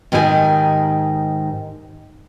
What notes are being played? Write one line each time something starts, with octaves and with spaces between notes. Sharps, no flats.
G#2 D#3 G4 A#4 G#5